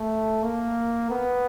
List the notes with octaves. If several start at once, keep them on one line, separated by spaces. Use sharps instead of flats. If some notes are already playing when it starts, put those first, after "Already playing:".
Already playing: A3
A#3
B3